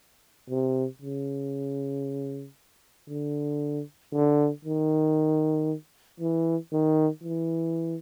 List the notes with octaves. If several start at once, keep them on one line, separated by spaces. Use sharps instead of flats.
C3
C#3
D3
D3
D#3
E3
D#3
E3